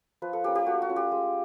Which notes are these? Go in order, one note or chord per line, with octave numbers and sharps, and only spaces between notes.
F3 B4
A4
A#3 C#4 G4
G4
A3 F#4
F#4
C#4 F4
G4
G#3